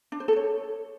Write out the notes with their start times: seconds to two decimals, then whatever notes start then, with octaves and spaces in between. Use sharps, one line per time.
0.12 D4
0.20 C5
0.28 A4
0.36 C#5